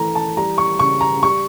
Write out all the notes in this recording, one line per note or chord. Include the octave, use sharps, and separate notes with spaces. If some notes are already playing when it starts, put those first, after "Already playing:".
Already playing: E3 A3 A#5
A5
G3 A#5
C#6
C#3 C#6
A#5
G3 C#6